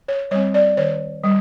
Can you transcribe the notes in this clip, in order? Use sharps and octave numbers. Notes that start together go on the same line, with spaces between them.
C#5
G3 C4 C#5
D5
D#3 C#5
G3